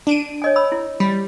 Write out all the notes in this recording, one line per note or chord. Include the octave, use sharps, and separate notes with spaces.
D4 D7 D#7
C#5 D#5 G#5
B5 E6
E4
G3 B5